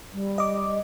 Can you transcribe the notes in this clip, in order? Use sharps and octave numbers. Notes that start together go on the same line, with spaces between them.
G3
D#5 D6